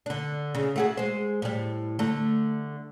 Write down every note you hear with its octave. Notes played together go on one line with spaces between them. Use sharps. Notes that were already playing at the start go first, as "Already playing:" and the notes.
D3 D4
C#3
A3 F#4 G#4
G#3 C5
A2 G3
D3 A3